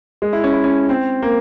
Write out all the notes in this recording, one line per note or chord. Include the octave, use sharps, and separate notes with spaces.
G#3
E4
C#4
E4
C#4
C4
A#3